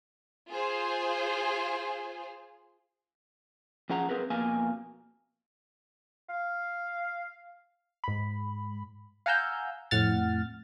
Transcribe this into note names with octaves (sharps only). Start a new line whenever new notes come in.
F4 G#4 C5
F3 C#4 G#4 F#5 A#5
C4 G#4 A#4 B4
F2 B2 A#3 F5 G#5
F5
G#2 B5
F5 F#5 G#5 A#5 E6 G6
F2 A2 F#5 F6 A6